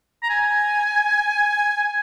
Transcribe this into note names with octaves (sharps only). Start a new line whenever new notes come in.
A#5
G#5